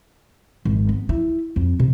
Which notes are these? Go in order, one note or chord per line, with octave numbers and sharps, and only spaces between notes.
G#1
B3
E4
F2
C3